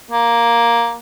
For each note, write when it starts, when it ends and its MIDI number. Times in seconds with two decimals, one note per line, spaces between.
0.11 0.95 58